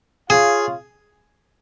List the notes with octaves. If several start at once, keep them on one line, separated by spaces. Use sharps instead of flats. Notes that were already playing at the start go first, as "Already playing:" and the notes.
F4 G#4 C#5 F5